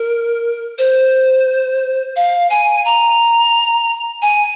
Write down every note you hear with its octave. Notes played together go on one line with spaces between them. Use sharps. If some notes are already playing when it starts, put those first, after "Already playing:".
Already playing: A#4
C5
F5
G#5
A#5
G#5